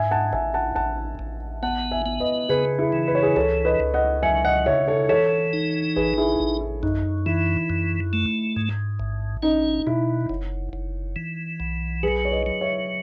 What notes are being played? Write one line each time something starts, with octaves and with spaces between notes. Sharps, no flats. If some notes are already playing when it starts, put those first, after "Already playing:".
Already playing: G#2 E5 G#5
F#5 A5
A1 E5 G#5
F#5 A5
A1 F#5 A5
A1
B3 F#5 A5
E5 G#5
B3
B4 D#5
C#3 G#4 B4
E4 G#4
E3
B4
C#5
G#4 B4
C#2 A4 C#5
B4 D#5
C#2
D#5 F#5
F#3 E5 G#5
D#5 F#5
C#3 C#5 E5
A4 C#5
E3 A4 C#5
D#4
A1 G#4 B4
E4 G#4
A1
E4
F#2 D#4
E3 E4
F#2
A3
G#2
A1
C#4 D#4
B2 E4
F#1
F#1
E3
B1
F#3 G#4 B4
C#5
B4 D#5
F#3
C#5 E5